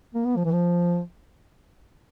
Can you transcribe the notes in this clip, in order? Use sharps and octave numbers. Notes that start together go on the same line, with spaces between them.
A#3
B3
F3
E3
F3